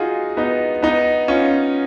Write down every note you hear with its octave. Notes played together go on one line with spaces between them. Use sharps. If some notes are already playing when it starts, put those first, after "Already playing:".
Already playing: D#4 F4 F#4 G#4
B3 D#4
B3 D#4
C#4 F4